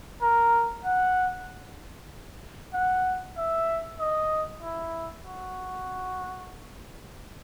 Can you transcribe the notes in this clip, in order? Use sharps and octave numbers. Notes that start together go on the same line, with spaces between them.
A#4
F#5
F#5
E5
D#5
E4
F#4